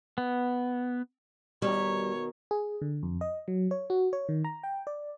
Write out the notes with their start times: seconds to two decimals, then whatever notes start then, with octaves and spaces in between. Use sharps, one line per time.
0.18 B3
1.62 B2 D#3 G3 C#5
2.51 G#4
2.82 D3
3.03 F2
3.21 D#5
3.48 F#3
3.71 C#5
3.90 F#4
4.13 C#5
4.29 D#3
4.45 A#5
4.64 G5
4.87 D5